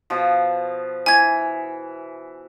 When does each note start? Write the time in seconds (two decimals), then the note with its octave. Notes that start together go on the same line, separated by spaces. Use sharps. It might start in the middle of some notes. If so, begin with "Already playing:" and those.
0.10 B2 F3
1.06 E3 G#5 G#6